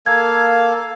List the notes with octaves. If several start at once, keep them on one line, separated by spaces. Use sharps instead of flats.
A#3 A4 F5 G#6